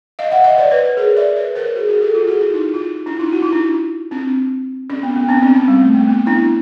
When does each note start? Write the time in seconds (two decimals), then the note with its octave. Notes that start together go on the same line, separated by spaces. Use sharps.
0.19 D#5 F5
0.32 E5 F#5
0.44 D#5 F5
0.58 C5 D5
0.71 B4 C#5
0.97 G#4 A#4
1.16 D5 E5
1.36 B4 C#5
1.55 A#4 C5
1.75 F#4 G#4
1.88 F#4 G#4
2.02 G4 A4
2.14 F4 G4
2.28 F#4 G#4
2.40 E4 F#4
2.54 D#4 F4
2.74 D#4 F4
3.06 D4 E4
3.19 D#4 F4
3.32 E4 F#4
3.42 D#4 F4
3.52 D4 E4
4.11 C4 D4
4.90 C#4
5.03 B3
5.16 B3
5.29 C4 D4
5.42 C#4
5.55 C4
5.68 G3
5.81 A3
5.94 A#3
6.07 B3
6.26 D4 E4